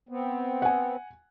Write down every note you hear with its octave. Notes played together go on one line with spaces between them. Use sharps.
B3 C4
F#5 G#5